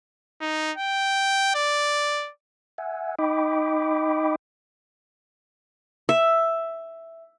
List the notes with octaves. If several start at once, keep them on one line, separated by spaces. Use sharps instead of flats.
D#4
G5
D5
E5 F#5 G#5
D#4 D#5 G5 B5 D6
E5